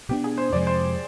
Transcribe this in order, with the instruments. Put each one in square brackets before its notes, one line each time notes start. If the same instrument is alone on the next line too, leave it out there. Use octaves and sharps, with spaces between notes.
[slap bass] B2 B3 D4 [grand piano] G4
[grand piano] G#4
C5
[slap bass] F2 C3 F3 G#3 [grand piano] D5
[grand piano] C5